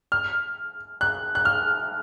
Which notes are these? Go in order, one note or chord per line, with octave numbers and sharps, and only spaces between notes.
F6
F#6
F#6
F6